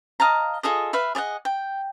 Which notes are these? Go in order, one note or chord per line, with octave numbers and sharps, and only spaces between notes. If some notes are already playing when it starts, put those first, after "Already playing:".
D#5 F5 A5 A#5
F4 G#4 A4 D#5
B4 E5 F5
G#4 D5 D#5 F#5
G5